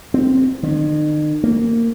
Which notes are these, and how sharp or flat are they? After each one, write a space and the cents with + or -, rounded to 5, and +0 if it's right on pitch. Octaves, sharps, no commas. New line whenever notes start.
C4 -5
D#3 -40
A#3 -20